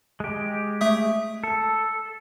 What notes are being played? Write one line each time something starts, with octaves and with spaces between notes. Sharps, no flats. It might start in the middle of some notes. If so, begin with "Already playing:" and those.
G#3 G4
A3 E5 D#6
A4